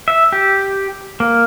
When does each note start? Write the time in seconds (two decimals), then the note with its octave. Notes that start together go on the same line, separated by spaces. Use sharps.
0.08 E5
0.32 G4
1.20 A#3